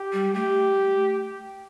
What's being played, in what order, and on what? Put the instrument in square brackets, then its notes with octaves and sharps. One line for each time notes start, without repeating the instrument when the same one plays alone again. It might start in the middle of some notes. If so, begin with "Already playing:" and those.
Already playing: [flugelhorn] G4
[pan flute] G3
[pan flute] A3 [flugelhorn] G4